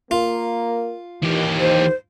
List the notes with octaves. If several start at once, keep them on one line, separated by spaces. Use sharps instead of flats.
A#3 F4
D#2 E3 G4
C5